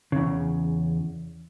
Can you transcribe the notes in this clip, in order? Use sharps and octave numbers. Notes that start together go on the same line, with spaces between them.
E2 C#3